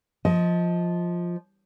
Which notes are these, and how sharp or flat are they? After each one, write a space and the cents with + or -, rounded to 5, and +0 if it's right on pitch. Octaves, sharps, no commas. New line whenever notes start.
F3 +0 D#5 +20